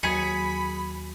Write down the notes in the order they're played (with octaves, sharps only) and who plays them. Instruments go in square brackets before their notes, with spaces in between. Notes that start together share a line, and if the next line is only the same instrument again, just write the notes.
[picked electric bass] D#2 F#3 [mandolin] G#4 [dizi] B5 [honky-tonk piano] G#6 B6 C#7